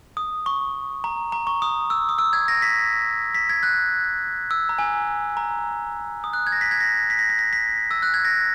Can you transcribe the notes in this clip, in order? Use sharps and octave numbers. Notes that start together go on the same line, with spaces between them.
D#6
C#6
A#5
A#5
C#6
D#6
E6
D#6
E6
G#6
A#6
B6
B6
G#6
F#6
E6
A#5
G#5
A#5
D#6
F#6
G#6
A#6
B6
G#6
A#6
B6
A#6
B6
A#6
B6
E6
F#6
G#6
A#6